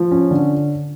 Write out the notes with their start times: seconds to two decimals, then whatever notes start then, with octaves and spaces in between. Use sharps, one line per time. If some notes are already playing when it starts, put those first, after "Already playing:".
Already playing: F3
0.11 C#4
0.31 D3